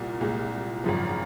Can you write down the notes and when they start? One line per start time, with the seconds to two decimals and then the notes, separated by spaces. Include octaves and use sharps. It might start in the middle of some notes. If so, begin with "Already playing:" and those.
Already playing: C2 A#2
0.21 C2 A#2 G#3
0.84 G#1 F#2 C#3 F3